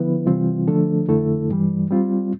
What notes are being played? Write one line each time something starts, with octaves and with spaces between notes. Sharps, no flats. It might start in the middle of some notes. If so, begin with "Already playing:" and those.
Already playing: D3 F3 B3 E4 B4
C3 E3 G3 C4 F4
D3 F3 A3 D4 A4
F2 D3 A3 E4 A4
G2 E3 G3
G3 C4 F4